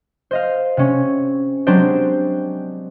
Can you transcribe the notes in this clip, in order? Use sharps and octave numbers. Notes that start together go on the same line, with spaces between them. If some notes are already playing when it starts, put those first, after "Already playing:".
C5 D#5 F5
C3 C#4
F#3 G#3 C4 D4 G4 C5